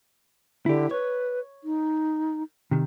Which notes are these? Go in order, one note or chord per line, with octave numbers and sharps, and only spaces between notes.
D3 E4 G4
B4 C#5
D#4
C3 D#3